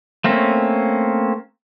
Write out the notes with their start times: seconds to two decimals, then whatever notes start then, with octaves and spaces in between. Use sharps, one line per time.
0.24 A3 A#3 C4 C#4